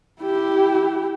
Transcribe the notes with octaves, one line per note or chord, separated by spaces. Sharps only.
E4 G4